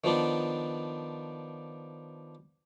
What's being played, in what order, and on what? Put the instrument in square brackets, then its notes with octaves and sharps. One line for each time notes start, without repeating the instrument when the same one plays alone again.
[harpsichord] D#3 F3 B3 D4